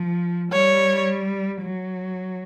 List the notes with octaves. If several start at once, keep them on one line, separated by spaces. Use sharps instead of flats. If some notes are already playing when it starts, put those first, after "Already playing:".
Already playing: F3
G3 C#5
F#3